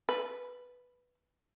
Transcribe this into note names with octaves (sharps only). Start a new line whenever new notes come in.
B4